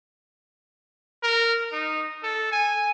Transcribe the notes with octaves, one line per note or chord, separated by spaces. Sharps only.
A#4
D#4
A4
G#5